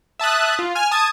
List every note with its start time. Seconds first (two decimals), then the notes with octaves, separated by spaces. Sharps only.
0.19 E5 A5 D#6 F#6
0.59 F4
0.75 G#5 F6
0.91 A5 D#6 G#6